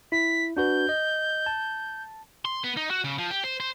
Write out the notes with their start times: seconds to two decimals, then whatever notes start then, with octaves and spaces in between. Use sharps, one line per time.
0.12 E4 B6
0.57 D4 F#4 B4 G6
0.89 D#5
1.46 A5
2.45 C6
2.64 B3
2.77 D#4
2.90 F#4
3.04 C#3
3.18 F3
3.31 G4
3.44 C5
3.60 C5